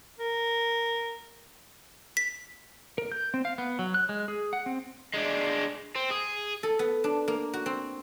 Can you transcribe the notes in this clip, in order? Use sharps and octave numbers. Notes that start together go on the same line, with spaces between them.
A#4
B6
A#4
G6
C4
F5
B3
F#3
F#6
G#3
G#4
F#5
C4
G#3 D4
C4
G#4
A4
B3
D4
A#3
F#4
C4